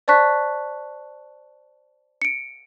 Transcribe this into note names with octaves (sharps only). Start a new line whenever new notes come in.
C5 D5 A5 C#6 F#6 B6
C#7 D7